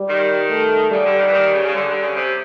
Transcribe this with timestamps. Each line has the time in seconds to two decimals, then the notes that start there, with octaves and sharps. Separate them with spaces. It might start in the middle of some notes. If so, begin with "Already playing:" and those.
Already playing: G3
0.09 D#3
0.49 A3
0.91 C#3 G3
1.04 D3
1.18 D#3
1.27 E3
1.33 D#3
1.53 C#3
1.65 C#3
1.74 D3 G3
1.88 D3
2.01 C#3
2.15 C3